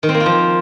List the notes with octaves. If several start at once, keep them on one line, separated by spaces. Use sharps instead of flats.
D#3
C4
A#3
F4
F3